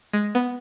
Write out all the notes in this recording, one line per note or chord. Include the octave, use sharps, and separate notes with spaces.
G#3
B3